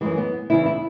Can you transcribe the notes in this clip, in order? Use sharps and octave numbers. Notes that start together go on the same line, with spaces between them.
F#2 E3 G#3
B3
E2 C#3 E3 E4
E4